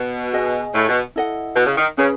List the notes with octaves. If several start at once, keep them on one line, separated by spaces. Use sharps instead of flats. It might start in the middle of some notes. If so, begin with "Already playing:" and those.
Already playing: B2
G#4 D#5 G#5
A2
B2
E4 A4 D#5 F#5
B2
C#3
D#3
C#3 C#4 G#4 B4